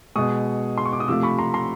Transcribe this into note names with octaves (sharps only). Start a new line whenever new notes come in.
B2 G#3 C#6 D#6
C6
C#6
D6
D#6
C3 F3 A3 D6 E6
B5 C#6
A#5 C6
A#5 C6